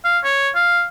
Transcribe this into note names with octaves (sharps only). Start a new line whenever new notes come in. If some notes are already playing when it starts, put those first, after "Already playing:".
F5
C#5
F5